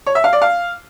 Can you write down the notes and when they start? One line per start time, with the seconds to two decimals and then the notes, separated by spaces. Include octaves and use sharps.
0.06 C#5
0.15 E5
0.24 F5
0.33 D5
0.42 F5